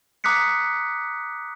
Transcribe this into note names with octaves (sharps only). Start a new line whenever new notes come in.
A#5 D6 D#6 F#6 B6 C#7